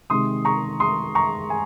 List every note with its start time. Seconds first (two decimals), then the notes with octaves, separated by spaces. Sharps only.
0.10 C3 D#3 G#3 C4 C6 D#6
0.45 A#5 C#6
0.80 C6 D#6
1.15 A#5 C#6
1.50 G#5